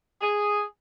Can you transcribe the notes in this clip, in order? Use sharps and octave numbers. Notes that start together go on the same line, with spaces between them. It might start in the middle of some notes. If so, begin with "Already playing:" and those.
G#4